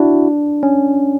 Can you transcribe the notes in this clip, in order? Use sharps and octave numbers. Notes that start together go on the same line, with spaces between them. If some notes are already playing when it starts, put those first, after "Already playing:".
Already playing: D4 E4 F#4
C#4